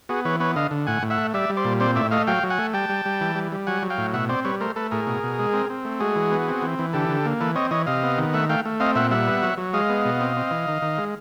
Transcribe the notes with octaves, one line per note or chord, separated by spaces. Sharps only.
B3 F#4 G#4
E3 B4 C#5
B3 B4 C#5
D3 D#5 F5
D3
A2 F#5 G#5
A2
E5 F#5
A3
G3 D5 E5
G3
C5 D5
A#2
C4 C5 D5
A2 D5 E5
A3 D#5 F5
F#3 F5 G5
F#3
F#5 G#5
A3
G3 G5 A5
G3
G3
E3
G3
G3
F#3 F#5 G#5
F#3
F5 G5
A2
B2 E5 F#5
C4 C5 D5
G3 B4 C#5
A3 A#4 C5
A3 A4 B4
A2 G#4 A#4
B2
B2
G#3
C4
C4
A3
G#3 F#4 G#4
E3
B3
C4
E3
E3
D3 G4 A4
D3
A#3
E3 A4 B4
C4 C#5 D#5
E3 C#5 D#5
C3 D#5 F5
B3
D#3
A3 E5 F#5
A3 F5 G5
A3
C4 D#5 F5
A#2 E5 F#5
G3 E5 F#5
B3
F#3
F#3
G#3 D#5 F5
B3
B2
C4
C4
E3
D#3
D#3
G#3